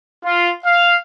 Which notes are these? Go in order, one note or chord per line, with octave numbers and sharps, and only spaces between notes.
F4
F5